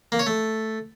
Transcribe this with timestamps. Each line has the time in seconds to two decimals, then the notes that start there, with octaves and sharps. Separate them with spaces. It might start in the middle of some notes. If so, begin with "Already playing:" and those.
0.12 A#3
0.19 C#5
0.26 A3